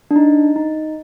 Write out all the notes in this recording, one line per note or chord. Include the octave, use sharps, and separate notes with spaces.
D4
D#4
D#4